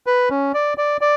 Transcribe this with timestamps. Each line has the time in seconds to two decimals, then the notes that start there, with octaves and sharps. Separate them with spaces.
0.07 B4
0.30 C#4
0.54 D5
0.78 D5
1.01 D5